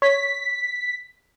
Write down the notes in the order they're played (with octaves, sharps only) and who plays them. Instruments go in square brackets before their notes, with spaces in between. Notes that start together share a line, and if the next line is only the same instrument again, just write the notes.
[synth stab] C#5 [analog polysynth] B6